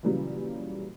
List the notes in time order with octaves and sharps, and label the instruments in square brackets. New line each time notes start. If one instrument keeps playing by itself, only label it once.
[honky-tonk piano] A#2 C#3 E3 F#3 G3